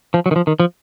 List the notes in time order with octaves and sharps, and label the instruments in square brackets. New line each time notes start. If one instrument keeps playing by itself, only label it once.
[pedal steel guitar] F3
F#3
D#3
F3
D#3
F3